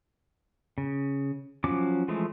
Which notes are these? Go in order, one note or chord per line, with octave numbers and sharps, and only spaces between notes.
C#3
F3 F#3 C#4 D6
E3 F3 G#3 A3